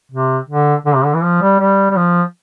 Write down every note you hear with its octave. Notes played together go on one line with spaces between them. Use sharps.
C3
D3
D3
C3
D3
E3
F3
G3
G3
G3
F3